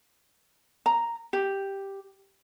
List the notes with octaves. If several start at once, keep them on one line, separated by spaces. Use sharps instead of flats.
A#5
G4